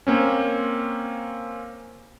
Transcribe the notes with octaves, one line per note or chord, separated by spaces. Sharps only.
A#3 C4 C#4